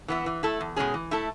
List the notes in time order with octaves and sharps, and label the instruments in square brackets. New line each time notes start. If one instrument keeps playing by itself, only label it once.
[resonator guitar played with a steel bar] E3 B3 E4
E3
A3 E4 A4
E2
B2 G#3 C#4 G#4
E3
A3 E4 A4